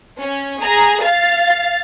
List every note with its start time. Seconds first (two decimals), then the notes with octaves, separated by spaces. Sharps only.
0.21 C#4
0.60 G#4 A#5
1.02 F5 A6